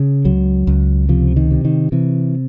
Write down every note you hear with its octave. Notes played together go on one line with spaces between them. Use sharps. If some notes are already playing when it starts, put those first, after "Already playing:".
Already playing: C#3
C#2 F#3
C#2
C3 F3
D#3
C3
D#3
C3 E3